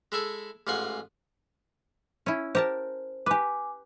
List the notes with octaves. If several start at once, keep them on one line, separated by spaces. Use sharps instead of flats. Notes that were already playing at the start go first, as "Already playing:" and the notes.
G#3 E4 G#4 A4
A1 G#2 F4 F#5 G#5 C6
C#4 E4
G4 A#4 C5 A5
G4 B4 G#5 D6